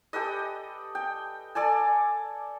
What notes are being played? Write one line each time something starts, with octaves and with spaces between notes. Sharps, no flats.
G4 A4 B4 D#5
G5
A4 D5 G#5 A5